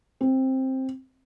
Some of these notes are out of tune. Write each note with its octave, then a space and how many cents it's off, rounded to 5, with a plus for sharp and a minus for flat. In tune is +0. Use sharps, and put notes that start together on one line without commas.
C4 +10